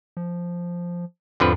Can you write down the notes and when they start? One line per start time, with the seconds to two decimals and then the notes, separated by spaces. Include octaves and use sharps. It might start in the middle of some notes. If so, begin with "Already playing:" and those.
0.17 F3
1.40 E2 G#2 D3 F3 C4 B4